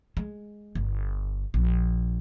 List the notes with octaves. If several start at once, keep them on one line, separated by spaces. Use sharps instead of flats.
G#3
G1
A#1